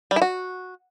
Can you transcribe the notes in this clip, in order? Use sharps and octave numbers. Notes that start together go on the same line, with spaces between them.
G3
E4
F#4